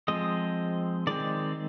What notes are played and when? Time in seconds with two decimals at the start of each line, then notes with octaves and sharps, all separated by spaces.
0.08 F3 G#3 C4 D#5
1.07 D#3 G#3 C4 D5